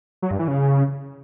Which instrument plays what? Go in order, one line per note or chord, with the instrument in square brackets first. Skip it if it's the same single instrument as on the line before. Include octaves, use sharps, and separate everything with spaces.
[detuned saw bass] F#3
G2
E3
C#3